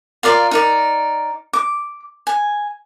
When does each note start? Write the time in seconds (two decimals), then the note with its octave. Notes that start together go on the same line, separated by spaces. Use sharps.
0.23 F4 A#4 D5 F5
0.51 D#4 A#4 D5
1.53 D6
2.27 G#5